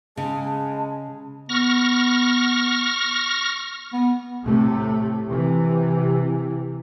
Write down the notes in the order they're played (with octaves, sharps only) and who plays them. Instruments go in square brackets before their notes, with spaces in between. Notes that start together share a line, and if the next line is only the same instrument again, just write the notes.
[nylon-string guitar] C#3 [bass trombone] G#3 [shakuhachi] A5
[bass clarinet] B3 [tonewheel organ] C#6 F6 A#6
[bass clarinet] B3
[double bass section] A2 C3 A3
C3 E3